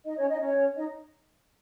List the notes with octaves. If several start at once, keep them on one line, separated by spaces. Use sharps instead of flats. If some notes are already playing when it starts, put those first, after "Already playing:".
D#4 D#5
C#4 C#5
D#4 D#5
C#4 C#5
D#4 D#5